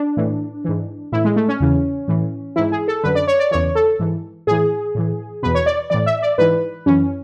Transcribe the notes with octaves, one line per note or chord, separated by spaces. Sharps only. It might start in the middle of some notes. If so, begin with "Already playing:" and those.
Already playing: D4
A2 E3
G#2 E3
A2 E3 E4
G#3
A3
C#4
E2 C#3 E3
A2 E3
G#2 E3 E4
G#4
A4
F#2 D3 B4
D5
C#5
D5
E2 C#3 E3 C#5
A4
G#2 E3
A2 E3 G#4
A2 E3
E2 B2 B4
C#5
D5
A2 E3 D5
E5
D5
G#2 E3 B4
F#2 E3 C#4